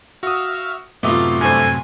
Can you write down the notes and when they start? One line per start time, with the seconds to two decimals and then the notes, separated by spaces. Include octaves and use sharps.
0.23 F#4 E5 F5 D#6
1.03 F#2 A2 C3 A3 B3 D#4 F4 G4
1.41 G2 A4 C5 G#5